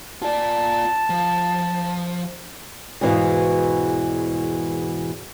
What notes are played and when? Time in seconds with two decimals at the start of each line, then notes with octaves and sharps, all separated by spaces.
0.22 F4 D5 A5
1.10 F3
3.01 E2 G#2 B2 E3 F#4 F5